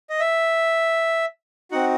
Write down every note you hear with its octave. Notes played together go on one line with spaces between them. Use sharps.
D#5
E5
C4 D#4 F#4 F#5